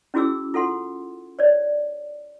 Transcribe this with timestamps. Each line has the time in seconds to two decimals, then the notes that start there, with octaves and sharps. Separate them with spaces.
0.14 C#4 E4 F#4 G#4 D6 E6
0.54 F4 A4 F#5 C6
1.39 C#5 D5